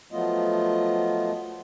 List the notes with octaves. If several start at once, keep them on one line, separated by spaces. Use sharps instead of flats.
F3 F#3 A3 B3 F4 D#5